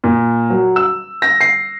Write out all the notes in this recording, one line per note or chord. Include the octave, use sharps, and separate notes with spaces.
A#2
F#3
E6
A#6
C7